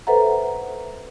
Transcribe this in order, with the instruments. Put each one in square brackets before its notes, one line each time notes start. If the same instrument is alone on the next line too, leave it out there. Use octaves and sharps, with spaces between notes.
[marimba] A4 B4 C5 E5 F#5 A#5